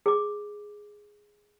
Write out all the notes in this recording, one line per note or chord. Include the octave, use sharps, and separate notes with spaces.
G#4 D6